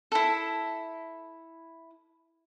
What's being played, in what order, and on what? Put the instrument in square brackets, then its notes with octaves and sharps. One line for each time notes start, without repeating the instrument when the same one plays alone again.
[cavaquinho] E4 A4